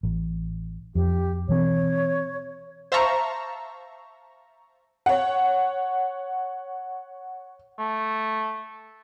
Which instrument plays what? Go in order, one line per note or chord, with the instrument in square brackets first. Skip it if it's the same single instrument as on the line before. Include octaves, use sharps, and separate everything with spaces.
[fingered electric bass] A1
[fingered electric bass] F2 [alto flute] G4
[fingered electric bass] B2 E3 C4 [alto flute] C#5
[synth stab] C5 E5 F5 A5 A#5 C#6
[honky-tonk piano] C#5 F#5
[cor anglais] A3